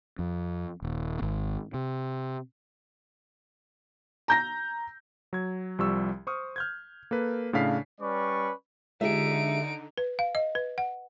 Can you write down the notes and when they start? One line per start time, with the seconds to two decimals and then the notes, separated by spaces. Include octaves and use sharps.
0.19 F2
0.82 D#1
1.22 G#1
1.74 C3
4.28 A#5 G6 A#6
5.33 F#3 G#6
5.78 C2 F3 G3 C#6 E6
6.27 C5 C#6 D#6 F6
6.56 F6 G6 G#6
7.11 A#3 A4 B4
7.53 A2 C#3 D4 F5 B6 C7
8.01 G3 C#4 B4 D5 B5 C#6
9.01 D3 G#3 D#4 F4 G4 G#4 E5 D7
9.98 B4
10.19 F5
10.35 D#5
10.55 B4
10.78 F#5